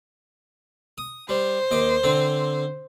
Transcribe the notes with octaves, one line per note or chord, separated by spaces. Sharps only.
D#6
G3 C5
D#2 D#5 D6
D3 C4